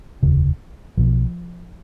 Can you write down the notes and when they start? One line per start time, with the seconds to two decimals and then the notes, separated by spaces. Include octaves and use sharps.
0.23 F1 D#2 C#3
0.97 B1 B2 F3